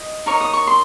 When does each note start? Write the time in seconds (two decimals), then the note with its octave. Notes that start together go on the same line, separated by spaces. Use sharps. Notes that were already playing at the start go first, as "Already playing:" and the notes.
Already playing: D#5
0.26 D#4 A#4 C#5 C#6
0.41 D#6
0.53 C#6
0.67 C6